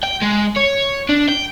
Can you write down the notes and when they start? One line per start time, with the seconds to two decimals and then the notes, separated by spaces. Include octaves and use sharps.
0.03 G5
0.22 G#3
0.56 C#5
1.09 D4
1.29 G5